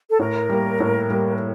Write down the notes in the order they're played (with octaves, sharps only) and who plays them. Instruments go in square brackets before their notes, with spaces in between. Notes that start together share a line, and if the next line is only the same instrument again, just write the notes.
[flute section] A4
[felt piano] A2 [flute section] A#4
[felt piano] G3 A#3
A2
G3 A#3